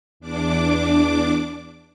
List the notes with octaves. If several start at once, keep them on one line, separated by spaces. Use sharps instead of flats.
E2 D4 D6